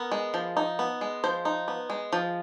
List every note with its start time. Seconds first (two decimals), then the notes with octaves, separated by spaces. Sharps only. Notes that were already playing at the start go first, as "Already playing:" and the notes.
Already playing: B3 A#4
0.12 G#3
0.34 F3
0.57 D#4
0.79 B3
1.01 G#3
1.24 F3 C5
1.45 D#4
1.68 B3
1.90 G#3
2.13 F3